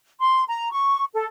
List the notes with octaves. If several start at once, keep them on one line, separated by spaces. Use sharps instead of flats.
C6
A#5
C#6
A4